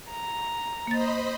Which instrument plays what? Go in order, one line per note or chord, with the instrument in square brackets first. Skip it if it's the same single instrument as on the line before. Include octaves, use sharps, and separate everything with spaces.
[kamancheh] A#5
[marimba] A#3 A6 [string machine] C5 D#5 B5